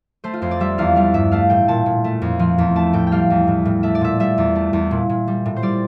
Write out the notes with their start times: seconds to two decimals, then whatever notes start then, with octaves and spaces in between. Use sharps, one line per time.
0.24 A3 C5
0.33 F4
0.42 F2 C5
0.51 D5
0.60 G3 E5
0.78 E2 F5
0.96 G3 F5
1.14 G2 E5
1.31 A3 F5
1.49 A2 G5
1.68 A#2 A5
1.86 A#2
2.04 A3
2.22 F2
2.39 F3
2.58 E2
2.76 A3 A5
2.93 A2 G5
3.07 G5
3.12 G3 F5
3.30 E2
3.48 A2
3.65 A2
3.83 A3 E5
3.95 D5
4.01 A#2 E5
4.20 G3 E5
4.38 E2
4.56 A3
4.73 E2
4.91 A#2
5.09 A#2
5.28 G3
5.46 A2
5.56 C5
5.63 G3 D5